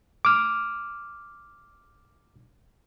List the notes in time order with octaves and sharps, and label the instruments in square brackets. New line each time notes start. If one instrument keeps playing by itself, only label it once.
[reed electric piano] D6 F6